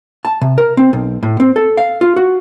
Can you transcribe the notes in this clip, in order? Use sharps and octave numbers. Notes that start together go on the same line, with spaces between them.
A5
C3
A#4
C4
B1
A2
C4
A4
F5
F4
F#4